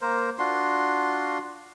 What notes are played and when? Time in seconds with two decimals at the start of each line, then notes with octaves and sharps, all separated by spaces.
0.01 A#3 A#4 C5
0.39 D4 F4 F#4 C6